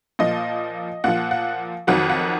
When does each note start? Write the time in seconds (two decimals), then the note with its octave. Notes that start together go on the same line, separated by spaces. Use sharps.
0.19 A#2 F3 D#5
1.04 A#2 F3 F#5
1.31 F#5
1.87 F2 D#3 F#3 F#5
2.10 F#5